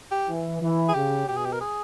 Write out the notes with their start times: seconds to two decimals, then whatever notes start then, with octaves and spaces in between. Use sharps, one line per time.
0.11 G4
0.28 E3
0.61 E3
0.88 G#4
0.94 C#3 G4
1.28 B2 G4
1.37 G#4
1.45 G4
1.52 A#4
1.61 G#4